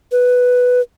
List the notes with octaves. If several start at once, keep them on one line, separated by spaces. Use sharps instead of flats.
B4